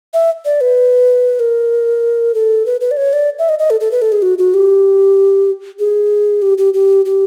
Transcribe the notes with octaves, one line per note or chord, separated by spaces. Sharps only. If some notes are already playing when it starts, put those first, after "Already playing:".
E5
D5
B4
A#4
A4
B4
B4
D5
C#5
D5
E5
D#5
D#5
A4
A4
B4
A4
G#4
F#4
F#4
G4
G#4
G4
G4
G4
G4